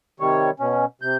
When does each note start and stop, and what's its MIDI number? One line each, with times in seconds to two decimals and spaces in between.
0.20 0.50 48
0.20 0.50 51
0.20 0.50 55
0.20 0.50 73
0.60 0.85 47
0.60 0.85 61
1.02 1.17 48
1.02 1.17 91